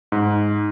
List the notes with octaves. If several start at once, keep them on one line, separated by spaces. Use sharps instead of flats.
G#2